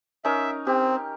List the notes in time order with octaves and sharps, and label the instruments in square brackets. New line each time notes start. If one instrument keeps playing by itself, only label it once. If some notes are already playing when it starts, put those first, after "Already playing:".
[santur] C#4 D#4 A#4 [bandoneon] E5
[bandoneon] C4 [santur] G4